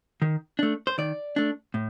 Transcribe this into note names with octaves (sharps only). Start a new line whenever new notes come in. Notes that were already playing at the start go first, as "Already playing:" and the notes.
D#3
A3 D4
C5
D#3 D5
A3 D4
A2